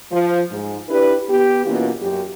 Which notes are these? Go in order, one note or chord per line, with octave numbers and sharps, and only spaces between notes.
F3
G#2
D4 E4 G4 B4
B3 G4
B2 E3 A#3 C#4 F4
F#2 G4